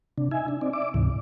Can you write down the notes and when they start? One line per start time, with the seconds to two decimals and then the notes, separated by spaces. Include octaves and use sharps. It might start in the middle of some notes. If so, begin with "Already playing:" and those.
0.18 C3 D4
0.31 D#4 E5 G#5
0.48 D4
0.61 C4 D#4 D5
0.73 D5 E5 D6
0.94 D2 G#2 C3 E3